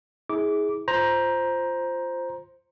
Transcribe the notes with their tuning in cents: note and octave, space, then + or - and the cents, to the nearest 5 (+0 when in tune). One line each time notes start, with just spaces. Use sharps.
E4 -40 G#4 +0 D6 -15
F4 +0 C5 +0 A#5 +15